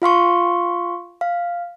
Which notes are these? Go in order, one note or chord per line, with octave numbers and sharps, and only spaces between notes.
F4 F5 C6 C#6
F5